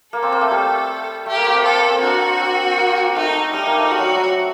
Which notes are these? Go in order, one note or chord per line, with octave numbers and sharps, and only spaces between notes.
A#3 A4
C4
A#3
A3
G3
A3 G4
A#3
C4
A#3
C4 A4
A#3
C4
D4 F#4
C4
A#3
A3 D#4
G3 D#4
A#3
A3
G3 F#4
F#3
F#3